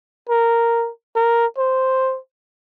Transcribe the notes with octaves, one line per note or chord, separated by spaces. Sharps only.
A#4
A#4
C5